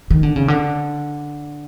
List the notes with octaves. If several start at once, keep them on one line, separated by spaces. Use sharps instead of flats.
D#3
D3
C#3
D3